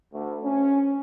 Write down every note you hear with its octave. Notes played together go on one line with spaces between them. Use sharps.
D2
C#4